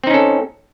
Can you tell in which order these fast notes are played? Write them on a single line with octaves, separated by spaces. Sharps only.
C4 D#4 C#4 A4